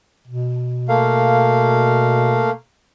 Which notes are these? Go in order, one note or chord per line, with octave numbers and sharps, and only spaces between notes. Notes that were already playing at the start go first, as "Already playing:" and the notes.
B2
A3 A#3 F5